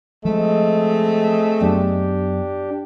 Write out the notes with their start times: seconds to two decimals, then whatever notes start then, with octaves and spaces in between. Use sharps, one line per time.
0.25 F3 G#3 A3 C4 G#4 D#5
1.61 F#2 F#3 B3 D4 G4